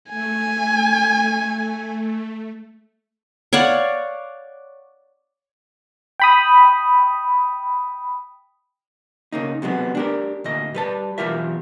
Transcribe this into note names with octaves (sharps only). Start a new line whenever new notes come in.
A3 G#5
C#5 D5 F5 F#5
G5 B5 D#6
C#3 A#3 D#4
C3 F#3 G#3 B3
D4 G4 A#4
D2 A#2 D#5
G3 B4 A5
B1 E3 F4 G4 A#4 E5